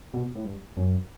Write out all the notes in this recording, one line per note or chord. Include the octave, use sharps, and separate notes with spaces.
B2
A2
G2
F#2